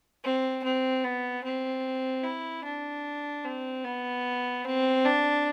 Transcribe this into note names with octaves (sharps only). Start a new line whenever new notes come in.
C4
C4
B3
C4
E4
D4
C4
B3
C4
D4